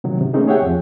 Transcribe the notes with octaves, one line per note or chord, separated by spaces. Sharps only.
C3 D#3 F#3
C3
A3 A#3 C4 C#4 D#4 G#4
G4 G#4 C#5 E5 F#5 G5
E2 F3 C4